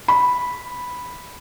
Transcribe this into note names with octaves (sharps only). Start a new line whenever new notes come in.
B5